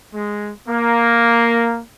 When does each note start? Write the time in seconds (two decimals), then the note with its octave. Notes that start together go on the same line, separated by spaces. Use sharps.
0.14 G#3
0.69 A#3